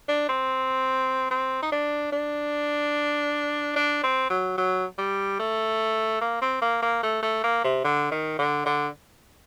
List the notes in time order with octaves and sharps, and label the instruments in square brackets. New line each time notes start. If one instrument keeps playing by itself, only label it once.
[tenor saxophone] D4
C4
C4
D#4
D4
D4
D4
C4
F#3
F#3
G3
A3
A#3
C4
A#3
A#3
A3
A3
A#3
C3
D3
D#3
D3
D3